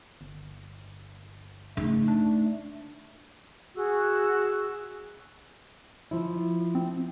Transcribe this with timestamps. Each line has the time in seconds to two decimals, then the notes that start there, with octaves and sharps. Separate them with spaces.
0.21 G1
1.77 C#3 A3 D#4
2.08 D4
3.75 F#4 G#4 E6
6.11 F3 E4
6.75 C4